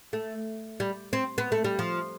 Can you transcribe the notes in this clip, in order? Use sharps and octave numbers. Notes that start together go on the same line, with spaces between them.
A3
G3
C4
B3
A3
G3
F3